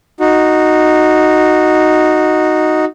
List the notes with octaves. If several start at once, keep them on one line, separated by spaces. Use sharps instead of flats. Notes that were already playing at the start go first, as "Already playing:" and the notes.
D#4 F#4